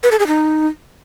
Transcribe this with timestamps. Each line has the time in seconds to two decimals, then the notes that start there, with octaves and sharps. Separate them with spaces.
0.03 B4
0.11 A4
0.19 G#4
0.27 D#4